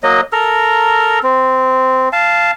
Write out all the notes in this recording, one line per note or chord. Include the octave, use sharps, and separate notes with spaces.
F#3 A#3 D#5
A4 A#4 A#5
C4
F5 A5